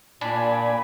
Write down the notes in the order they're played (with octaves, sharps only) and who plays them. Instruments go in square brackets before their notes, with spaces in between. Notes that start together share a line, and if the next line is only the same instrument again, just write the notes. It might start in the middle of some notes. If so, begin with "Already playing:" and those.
[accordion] A#2 [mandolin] D4 [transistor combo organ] D5 G#5 B5